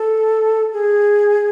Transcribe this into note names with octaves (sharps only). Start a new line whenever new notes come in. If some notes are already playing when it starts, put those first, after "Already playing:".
Already playing: A4
G#4